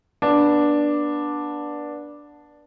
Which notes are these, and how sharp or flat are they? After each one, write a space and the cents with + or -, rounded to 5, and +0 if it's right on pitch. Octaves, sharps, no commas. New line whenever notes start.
B3 -30 D4 +0